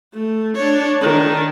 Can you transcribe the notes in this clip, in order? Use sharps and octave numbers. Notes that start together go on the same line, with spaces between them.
A3
D4 C#5
D#3 D4